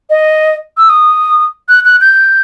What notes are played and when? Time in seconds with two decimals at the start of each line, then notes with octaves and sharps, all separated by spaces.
0.10 D#5
0.77 E6
0.89 D#6
1.69 F#6
1.85 F#6
2.01 G6